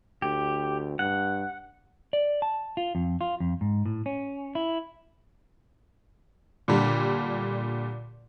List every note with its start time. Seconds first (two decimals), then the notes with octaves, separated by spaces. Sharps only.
0.22 D2 G4
0.99 G2 F#5
2.13 D5
2.42 A5
2.77 F4
2.95 F2
3.21 F4
3.40 F2
3.61 G#2
3.86 A2
4.06 C#4
4.55 E4
6.68 A#2 D3 G3